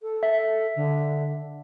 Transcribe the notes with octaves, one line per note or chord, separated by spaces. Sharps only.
A4
E5
D3